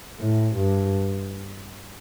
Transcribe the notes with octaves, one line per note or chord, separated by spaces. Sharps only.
A2
G2